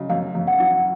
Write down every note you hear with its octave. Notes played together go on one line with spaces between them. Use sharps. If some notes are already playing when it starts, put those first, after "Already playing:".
Already playing: C#3 F#3 D#5
F#2 F5
F#2
F#5
F#3